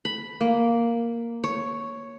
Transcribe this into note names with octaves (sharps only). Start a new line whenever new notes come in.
B5
A#3
C#5